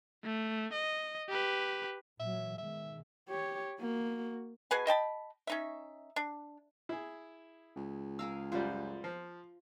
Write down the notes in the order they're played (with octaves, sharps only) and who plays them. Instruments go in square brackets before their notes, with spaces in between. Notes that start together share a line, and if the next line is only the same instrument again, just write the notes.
[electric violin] A3
D#5
G4 B4
[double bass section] A#2 E3 F#3 [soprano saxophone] E5
[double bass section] B2 D#3 G#3 [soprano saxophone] E5
[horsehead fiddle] G4 C#5
A#3 F#4
[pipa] B2 G#4 B4 G#5
D#5 G5 A5 B5
C#4 D#4 E5
D4
[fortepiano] E4 G#4
[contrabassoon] C#2
[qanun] G#4 A#4 F5 [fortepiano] E6
[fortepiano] F#2 G3 [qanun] F4 C5
[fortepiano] F3